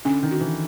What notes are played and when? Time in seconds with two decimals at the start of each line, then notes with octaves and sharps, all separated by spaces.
0.05 D3 C#4
0.23 D#3
0.31 F#4
0.41 E3